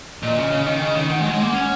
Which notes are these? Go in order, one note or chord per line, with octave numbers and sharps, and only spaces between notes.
A#2 D#5
C#3
C#3
D#3
C#3
D#3
D#3 F#5
G#3
F#3
G#3
A#3
C#4